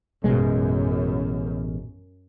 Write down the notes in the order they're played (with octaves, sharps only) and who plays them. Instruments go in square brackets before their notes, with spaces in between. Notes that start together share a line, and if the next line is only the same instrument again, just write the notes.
[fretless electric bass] A1 B2 G#3 [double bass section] F#2